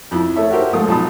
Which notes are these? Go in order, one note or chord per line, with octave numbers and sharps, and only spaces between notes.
F2 E4
A3 C#5 E5
F#4 G4 A#4 C5 E5
G#2 F3 A3 F4 D#6
B1 F3 A5 B5 D#6